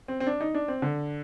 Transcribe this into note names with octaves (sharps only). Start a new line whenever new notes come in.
C4
C4
D4
D#4
D4
C4
D3